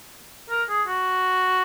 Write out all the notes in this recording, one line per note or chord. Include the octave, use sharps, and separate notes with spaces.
A#4
G#4
F#4